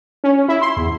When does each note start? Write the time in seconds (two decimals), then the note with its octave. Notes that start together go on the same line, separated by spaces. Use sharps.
0.24 C#4
0.48 E4
0.62 C6
0.77 E2